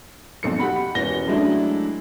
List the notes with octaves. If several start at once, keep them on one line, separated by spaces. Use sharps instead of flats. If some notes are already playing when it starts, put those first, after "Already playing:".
B1 F2 C#7
G4 F#5 B5
E1 E3 C#4 A#6 G7
F#3 G#3 A3 D4 E4